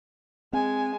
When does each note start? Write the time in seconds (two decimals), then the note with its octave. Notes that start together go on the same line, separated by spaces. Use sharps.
0.53 G#3 C4 G#5